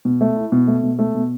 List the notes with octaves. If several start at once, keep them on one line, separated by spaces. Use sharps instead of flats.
B2
A3
E4
B2
A3
B2
A3
B2